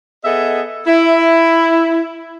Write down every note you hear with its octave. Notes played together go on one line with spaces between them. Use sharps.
B3 G#4 A4 D#5 E5
E4